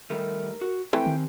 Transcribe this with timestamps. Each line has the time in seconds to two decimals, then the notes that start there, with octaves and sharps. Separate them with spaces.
0.10 D#3 G3 A3 A#4
0.61 F#4
0.93 E3 A3 C4 G4 G5 G#5
1.06 D#3